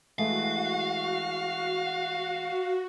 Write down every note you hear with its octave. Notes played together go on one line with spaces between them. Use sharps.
E3 G#3 A3 F#4 F5